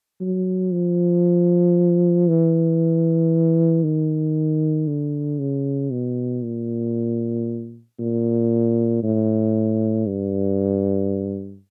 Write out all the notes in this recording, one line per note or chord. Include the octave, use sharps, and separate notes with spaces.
F#3
F3
E3
D#3
D3
C#3
B2
A#2
A#2
A2
G2